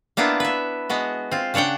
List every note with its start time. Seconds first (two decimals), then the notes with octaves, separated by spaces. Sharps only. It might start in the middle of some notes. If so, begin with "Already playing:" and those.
0.17 A#3 B3 D4 E4 F4
0.40 B4 E5
0.90 G#3 B3 F#4
1.31 C4 F4
1.54 C#3 D4 C#5 F#5 G5